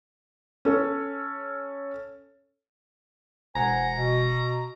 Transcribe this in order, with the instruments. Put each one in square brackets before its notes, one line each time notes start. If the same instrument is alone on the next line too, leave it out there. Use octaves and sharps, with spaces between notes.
[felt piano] C#4 A4 C#5
[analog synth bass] E1 [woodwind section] C5 F#5 G#5 [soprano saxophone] A#5
[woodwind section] B2